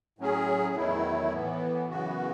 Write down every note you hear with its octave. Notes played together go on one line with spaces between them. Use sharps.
A2 F#3 C#4 G#4
E2 D#3 F#3 A3 E4
A2 E3 B3
F#2 C#3 E3 B3 F#4